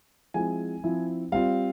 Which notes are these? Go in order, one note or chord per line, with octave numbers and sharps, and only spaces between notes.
F3 G#3 C4 E4 G#5
F3 C4 E4
G3 C4 F4 F5